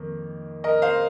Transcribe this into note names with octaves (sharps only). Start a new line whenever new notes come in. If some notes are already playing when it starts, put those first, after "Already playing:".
Already playing: F2 D#3 A#3
A#4 D#5
C5 F5